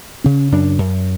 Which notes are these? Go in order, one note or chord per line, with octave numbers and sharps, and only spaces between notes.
C#3 C#4
F#2 D4
F#2